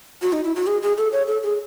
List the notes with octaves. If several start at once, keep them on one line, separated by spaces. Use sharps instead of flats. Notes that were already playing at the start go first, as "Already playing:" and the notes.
F#4
D#4
E4
F#4
G#4
G#4
A4
C#5
A4
G#4